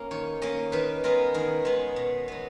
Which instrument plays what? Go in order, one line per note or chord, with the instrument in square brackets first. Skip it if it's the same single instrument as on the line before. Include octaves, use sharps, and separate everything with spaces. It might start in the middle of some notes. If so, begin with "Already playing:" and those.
Already playing: [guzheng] A#3 C#4
D#3 C#5
A#3 C#4 D#5
D#3 B4
G#3 B3 A#4
D#3 G#4
G#3 B3
B2
F#3 B3